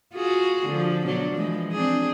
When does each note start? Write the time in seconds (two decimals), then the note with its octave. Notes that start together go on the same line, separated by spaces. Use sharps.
0.14 F4 F#4 G#4
0.67 D3 F3
1.06 B2 F#3 D4
1.34 E3 F3 G#3
1.73 C4 D4 G#4